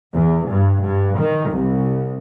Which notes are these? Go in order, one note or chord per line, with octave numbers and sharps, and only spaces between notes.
E2
G2
G2
D#3
C2